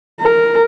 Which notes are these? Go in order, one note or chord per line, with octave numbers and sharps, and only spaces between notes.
A#4